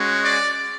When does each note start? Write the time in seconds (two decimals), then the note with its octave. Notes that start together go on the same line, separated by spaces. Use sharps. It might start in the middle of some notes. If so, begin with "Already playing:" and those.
Already playing: G#3 C#4 F#4
0.24 D5